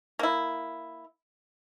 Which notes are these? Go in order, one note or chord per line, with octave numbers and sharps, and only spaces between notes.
A#3 E4